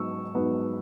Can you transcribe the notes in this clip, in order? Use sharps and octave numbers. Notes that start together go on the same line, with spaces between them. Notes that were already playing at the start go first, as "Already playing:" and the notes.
Already playing: G#2 F#3 B3 C#6 E6
G#2 F#3 B3